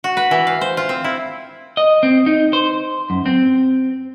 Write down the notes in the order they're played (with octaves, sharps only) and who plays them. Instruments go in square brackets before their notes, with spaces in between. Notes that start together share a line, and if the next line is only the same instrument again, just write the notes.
[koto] F#4
B4
E3
F5
C5
F4
C4
E4
[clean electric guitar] D#5
C4
D#4
C5
F#2
C4